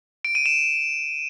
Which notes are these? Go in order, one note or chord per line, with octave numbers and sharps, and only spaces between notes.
D7
D#7
E7